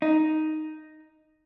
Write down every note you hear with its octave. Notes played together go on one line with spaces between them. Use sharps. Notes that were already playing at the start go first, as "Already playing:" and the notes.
D#4